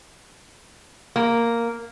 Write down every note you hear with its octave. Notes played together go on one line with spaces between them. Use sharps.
A#3